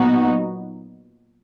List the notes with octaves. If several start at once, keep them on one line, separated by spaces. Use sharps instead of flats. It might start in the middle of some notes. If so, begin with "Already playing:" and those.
Already playing: A#2 F#3 B3 D#4 F#4